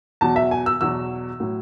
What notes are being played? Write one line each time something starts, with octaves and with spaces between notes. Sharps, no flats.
E2 B2 F#3 A5
E5
G#5
E6
E2 B2 F#3 E6
A2 F#3